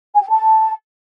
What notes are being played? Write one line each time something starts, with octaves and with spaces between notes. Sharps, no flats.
G#5
G5
A5